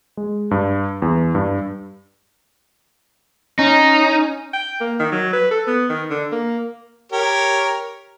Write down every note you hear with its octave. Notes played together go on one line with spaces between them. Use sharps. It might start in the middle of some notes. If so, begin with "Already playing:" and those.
G#3
G2
E2
G2
C#4 D#4
G5
A#3
D#3
F#3
B4
A4
B3
D#3
D3
A#3
G4 A#4 C#5